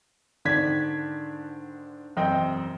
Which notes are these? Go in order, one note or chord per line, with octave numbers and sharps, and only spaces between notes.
G#2 D3 D#3 D4 G#6 B6
E1 F#2 C4 D#5 G5